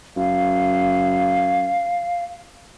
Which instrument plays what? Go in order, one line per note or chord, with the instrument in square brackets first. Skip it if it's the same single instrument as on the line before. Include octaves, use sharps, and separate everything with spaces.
[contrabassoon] F#2 [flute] F5